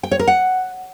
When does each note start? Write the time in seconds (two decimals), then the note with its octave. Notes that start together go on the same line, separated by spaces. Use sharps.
0.03 G5
0.11 C#5
0.19 A#4
0.27 F#5